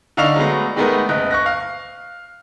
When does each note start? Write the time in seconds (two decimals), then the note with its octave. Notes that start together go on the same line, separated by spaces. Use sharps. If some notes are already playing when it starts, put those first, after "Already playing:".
0.17 D3 D#4 F5 C#6 F7
0.36 F#3 G#3 A3 B3
0.76 D#3 G#3 A3 B3 A#4 B4
1.09 F#1 D#5 F#6
1.31 C#6 F#6 A#6
1.46 F5